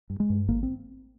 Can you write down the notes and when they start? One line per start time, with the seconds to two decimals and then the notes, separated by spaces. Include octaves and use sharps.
0.10 G2
0.20 G#3
0.30 G2
0.48 G#1 A#3
0.63 C4